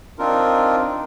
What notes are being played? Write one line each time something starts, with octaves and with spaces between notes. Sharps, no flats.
C4 D4 D#4 F4 A#4